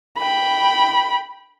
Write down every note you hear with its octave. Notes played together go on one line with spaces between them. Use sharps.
G5 B5